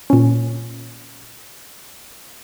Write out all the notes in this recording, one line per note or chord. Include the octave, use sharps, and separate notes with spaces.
A#2 C#4